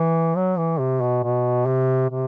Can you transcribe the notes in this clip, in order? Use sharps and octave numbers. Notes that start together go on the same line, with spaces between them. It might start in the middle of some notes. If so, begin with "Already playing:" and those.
Already playing: E3
F#3
E3
C3
B2
B2
C3
C3